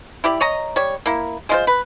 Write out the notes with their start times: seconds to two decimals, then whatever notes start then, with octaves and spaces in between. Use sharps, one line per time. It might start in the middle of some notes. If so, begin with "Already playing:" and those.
0.24 E4 G4 D5
0.41 C#5 D#5 A#5
0.76 G3 C#5
1.06 A#3 E4
1.49 G#3 F4 C5
1.67 B4